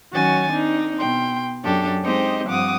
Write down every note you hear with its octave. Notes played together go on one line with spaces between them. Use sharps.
D#3 F#3 C#4 F#4 G#5 A6
C4 D4 D#4
B2 G5 C6
F#2 D4 G4 A4
G#3 C4 D#4 G4 C5 D#5
G2 F3 C4 F#5 D6 D#6